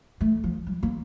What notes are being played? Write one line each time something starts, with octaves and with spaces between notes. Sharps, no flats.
A3
F3
G3
A#3